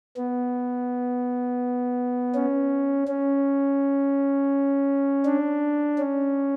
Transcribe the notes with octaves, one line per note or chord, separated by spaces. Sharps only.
B3
C#4
C#4
D4
C#4